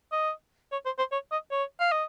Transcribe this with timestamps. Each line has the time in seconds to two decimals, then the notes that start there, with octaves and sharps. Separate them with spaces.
0.12 D#5
0.72 C#5
0.86 C5
0.98 C5
1.12 C#5
1.32 D#5
1.51 C#5
1.80 F5
1.92 D#5